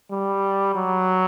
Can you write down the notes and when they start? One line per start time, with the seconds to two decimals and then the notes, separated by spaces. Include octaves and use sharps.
0.10 G3
0.75 F#3